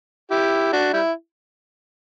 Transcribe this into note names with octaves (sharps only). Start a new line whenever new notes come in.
E4 G4
D4 F#4
G3 E4